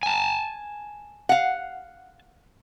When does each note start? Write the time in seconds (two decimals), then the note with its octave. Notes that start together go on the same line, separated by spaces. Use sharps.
0.03 G#5 A5
1.29 F5 F#5